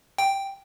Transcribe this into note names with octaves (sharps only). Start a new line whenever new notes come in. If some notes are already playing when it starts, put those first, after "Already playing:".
G5